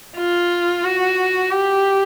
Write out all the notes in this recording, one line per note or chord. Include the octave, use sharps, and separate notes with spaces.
F4
F#4
G4